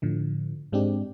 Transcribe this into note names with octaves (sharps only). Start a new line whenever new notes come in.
A2 D3 F3
G#2 G#3 C4 D4 G4